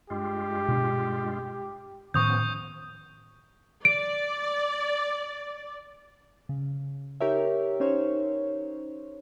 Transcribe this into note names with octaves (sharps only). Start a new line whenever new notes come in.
G2 G#3 F4 G4
B2 D4
A2 D#3 F3 B3 C#4 C#6 D#6 G6
D5 D7
C#3
D#4 G4 A#4 C#5 E5
C#4 D#4 C5 C#5